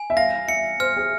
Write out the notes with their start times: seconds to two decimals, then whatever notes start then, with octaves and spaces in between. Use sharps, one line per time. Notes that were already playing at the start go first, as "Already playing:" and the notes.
Already playing: G#5
0.10 E5
0.17 F5 A#6
0.48 E5 C#7
0.80 C5 F6
0.96 G#4